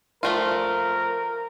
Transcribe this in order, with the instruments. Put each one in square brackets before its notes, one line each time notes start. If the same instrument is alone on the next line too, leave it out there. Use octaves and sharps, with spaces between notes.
[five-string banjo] F3 A3 F4 [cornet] A#4